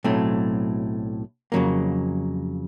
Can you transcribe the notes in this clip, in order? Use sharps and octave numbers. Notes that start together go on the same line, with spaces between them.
B1 A2 F#3 A3 C4
F2 C#3 F#3 A#3